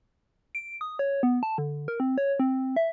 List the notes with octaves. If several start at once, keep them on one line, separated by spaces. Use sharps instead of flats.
D7
D#6
C#5
B3
A5
D3
A#4
C4
C#5
C4
E5